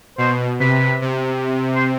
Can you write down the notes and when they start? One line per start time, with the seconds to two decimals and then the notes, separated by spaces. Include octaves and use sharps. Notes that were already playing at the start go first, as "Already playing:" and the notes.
0.18 B2 C5
0.60 C3 B4
1.02 C3
1.75 C5